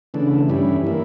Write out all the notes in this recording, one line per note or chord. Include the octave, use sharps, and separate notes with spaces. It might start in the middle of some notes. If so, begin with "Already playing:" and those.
C#3 E3 A3 D4
G2 E3 G3 C#4 E4
E3 A#3 E4